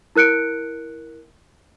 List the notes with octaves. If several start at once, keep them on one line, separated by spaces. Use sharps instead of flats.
E4 A#4 F#6 C#7 D7